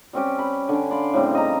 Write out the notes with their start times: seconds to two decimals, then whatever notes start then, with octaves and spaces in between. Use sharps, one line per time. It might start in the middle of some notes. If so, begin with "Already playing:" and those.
0.13 G3 C4 C#4 G4
0.39 B5
0.69 D3 G#5
0.91 D5 F5 B5 C6
1.13 A2 C#3 G3 C4
1.35 D#5 A#5